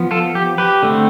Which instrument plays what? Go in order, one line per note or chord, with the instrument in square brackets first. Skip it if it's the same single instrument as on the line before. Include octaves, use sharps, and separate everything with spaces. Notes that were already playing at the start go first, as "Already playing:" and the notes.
Already playing: [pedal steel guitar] F3 B3
F4 A4
G4
G4 B4
D3 A3 C4